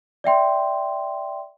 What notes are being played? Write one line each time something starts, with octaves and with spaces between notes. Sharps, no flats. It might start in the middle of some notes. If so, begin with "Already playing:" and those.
D5 E5 G5 C6